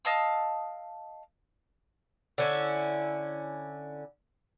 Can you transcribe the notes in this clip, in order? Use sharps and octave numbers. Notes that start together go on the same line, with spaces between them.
D#5 F5 A5 E6
D3 C#4 E4